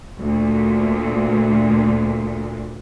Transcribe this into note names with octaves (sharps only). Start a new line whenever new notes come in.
D2 A#2